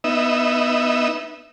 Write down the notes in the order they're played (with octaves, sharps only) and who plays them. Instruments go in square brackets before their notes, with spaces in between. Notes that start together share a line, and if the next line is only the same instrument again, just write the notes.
[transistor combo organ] B3 D#4 E5